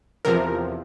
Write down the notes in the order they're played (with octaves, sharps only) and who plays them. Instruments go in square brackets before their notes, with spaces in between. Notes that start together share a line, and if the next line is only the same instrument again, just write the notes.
[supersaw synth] E2 C3 F3 A#4